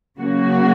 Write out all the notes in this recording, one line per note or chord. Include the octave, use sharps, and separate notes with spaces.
C#3 F#3 A#3 C#4 F#4